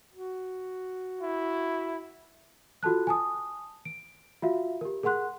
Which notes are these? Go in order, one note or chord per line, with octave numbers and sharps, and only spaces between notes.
F#4
E4
F4 F#4 A4 A5 F#6
G#5 A5 D#6
D7
F4 F#4 E5 F5
G4 A#4
G#4 A#4 F#5 C6 F#6